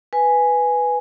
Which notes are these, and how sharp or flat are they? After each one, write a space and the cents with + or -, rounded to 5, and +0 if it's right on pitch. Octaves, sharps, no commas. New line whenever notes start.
B4 +0 G#5 +0